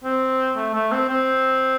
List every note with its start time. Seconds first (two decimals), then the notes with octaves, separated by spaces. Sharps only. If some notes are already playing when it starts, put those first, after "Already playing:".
0.04 C4
0.56 A3
0.75 A3
0.92 C4
1.09 C4